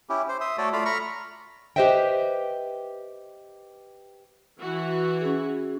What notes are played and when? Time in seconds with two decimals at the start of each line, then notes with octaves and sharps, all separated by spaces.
0.09 C#4 E4 G4
0.29 C5
0.41 E5 C6 D#6
0.58 A3 F#4 A4 C#5 D5
0.73 A3 F4 D5 F5 B5
0.85 A#5 B5 C#6 F6
1.76 G4 B4 C5 D#5 E5 G5
4.59 E3 F#4
5.21 C#4 G#4